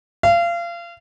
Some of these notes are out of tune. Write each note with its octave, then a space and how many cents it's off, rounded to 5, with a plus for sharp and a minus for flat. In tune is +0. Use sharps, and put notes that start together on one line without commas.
F5 -30